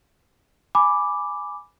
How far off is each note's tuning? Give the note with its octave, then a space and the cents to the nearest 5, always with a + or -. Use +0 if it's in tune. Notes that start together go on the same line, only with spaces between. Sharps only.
G#5 +0 B5 +0 D6 +0